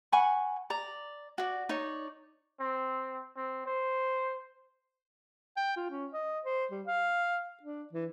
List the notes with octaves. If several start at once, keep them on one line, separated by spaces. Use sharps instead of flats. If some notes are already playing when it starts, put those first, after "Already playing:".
F#5 G#5 B5 C#6
D5 A#5
F#4 D5
D#4 C#5 D5
C4
C4
C5
G5
F4
C#4
D#5
C5
G3
F5
D4
E3